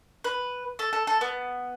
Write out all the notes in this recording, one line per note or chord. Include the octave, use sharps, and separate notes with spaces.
B4
A4
A4
A4
B3